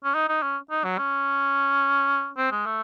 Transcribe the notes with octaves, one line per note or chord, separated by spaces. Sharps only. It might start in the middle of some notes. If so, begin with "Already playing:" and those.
C#4
D#4
D#4
C#4
D#4
F#3
C#4
C4
G#3
A3